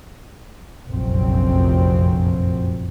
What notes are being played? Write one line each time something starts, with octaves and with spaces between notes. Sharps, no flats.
F1 A#1 F#2 F3 F#3 C4